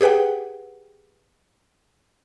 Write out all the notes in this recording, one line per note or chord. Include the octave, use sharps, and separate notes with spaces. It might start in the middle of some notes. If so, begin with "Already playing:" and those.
G4 G#4 B4 F#5 G5